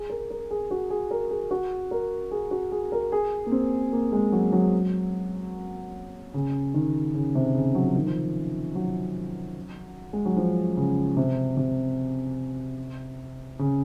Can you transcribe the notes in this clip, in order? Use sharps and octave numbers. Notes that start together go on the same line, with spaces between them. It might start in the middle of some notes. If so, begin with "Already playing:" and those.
Already playing: G#4
A#4
A#4
G#4
F#4
G#4
A#4
G#4
F#4
A#4
G#4
F#4
G#4
A#4
G#4
A#3
C4
A#3
G#3
F#3
F#3
C#3
D#3
C#3
C3
C#3
F#3
F3
D#3
F3
F#3
G#3
F#3
F3
C#3
C3
C3
C#3